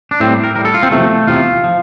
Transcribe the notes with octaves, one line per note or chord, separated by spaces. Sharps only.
D4
A2 G3 C4
A#4
A2 G3 A#4
A4
F4
C4
E2 C3 F3 A3
E2 C3 F3 F4
F3